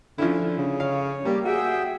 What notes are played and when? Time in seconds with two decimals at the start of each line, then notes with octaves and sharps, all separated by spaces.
0.18 D3 F3 C#4 E4
0.58 C#3
0.80 C#5 F5
1.25 G3 A#3 G4
1.45 F#4 G#4 E5 G5